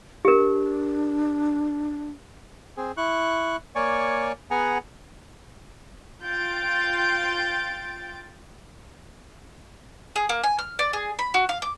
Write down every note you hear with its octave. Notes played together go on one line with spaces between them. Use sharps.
D4 G4 A#4
C4 G#4
E4 C#6 F#6
A#3 C#5 D5 G#5 C#6
B3 G#4 F#5 G#5 A#5
F4 G5 G6 A6 D7
G#4
A#3
G#5
F6
D5
G#4
B5
F#4
F5
D6